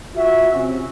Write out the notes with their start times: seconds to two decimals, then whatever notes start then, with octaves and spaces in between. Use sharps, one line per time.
0.16 F4 F#4 E5
0.54 C3 C#4